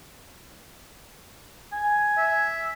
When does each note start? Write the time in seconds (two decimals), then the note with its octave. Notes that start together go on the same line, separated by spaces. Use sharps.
1.72 G#5
2.18 E5